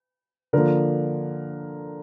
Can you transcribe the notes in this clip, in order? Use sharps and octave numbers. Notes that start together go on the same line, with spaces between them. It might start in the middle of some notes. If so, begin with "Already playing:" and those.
D3 F3 A#3 A#4